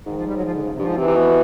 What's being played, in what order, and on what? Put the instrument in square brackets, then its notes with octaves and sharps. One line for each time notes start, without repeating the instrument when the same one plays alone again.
[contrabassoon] G#2 [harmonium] D#3
[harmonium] F3
G3
F#3
F3
D3
C#3
C3
[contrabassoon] G2 [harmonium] F3
[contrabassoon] G#2
[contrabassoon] C3 [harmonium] E3
[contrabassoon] C3
B2